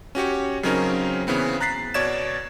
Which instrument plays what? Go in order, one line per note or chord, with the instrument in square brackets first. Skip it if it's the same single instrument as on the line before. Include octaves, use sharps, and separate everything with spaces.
[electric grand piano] C#4 F#4 G4 C#5
C#3 F#3 C4 C#4 D#4 A#4
C#3 E3 B3 C4
A#5 F#6 A6 B6 C7
B2 C#5 D5 G#6 E7